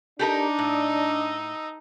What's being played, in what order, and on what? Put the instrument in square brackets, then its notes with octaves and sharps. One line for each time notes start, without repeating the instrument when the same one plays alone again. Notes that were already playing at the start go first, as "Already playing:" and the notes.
[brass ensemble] D4 [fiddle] D#4 [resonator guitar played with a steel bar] G4 A4 A#4
[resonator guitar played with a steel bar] A2 [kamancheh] D#5 E6